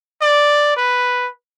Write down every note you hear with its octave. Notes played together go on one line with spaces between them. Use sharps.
D5
B4